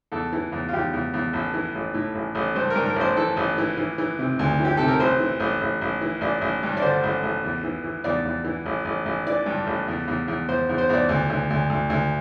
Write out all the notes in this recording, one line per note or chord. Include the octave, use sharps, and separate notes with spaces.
E2 A4
E3
E2
F4
E2 G4
E2
E2
A1 A4
E3
A1
A2
A1
A1
G2 C5
A#4
G2
A#4
A1 C5
E3 A4
A1
E3
E3
E3
C3
D2
E3
G4
C3 A4
A#4
A1 C5
E3
A1
A1
A1
E3
A1 D5
A1
G2
D5
D3 C5
A1
A1
E2
E3
E3
E2 D5
E2
E3
A1
A1
A1
E3 D5
G2
A1
E2
E2
E2
E2 C5
E2
C5
E2 D5
D2
D2
D2
D2
D2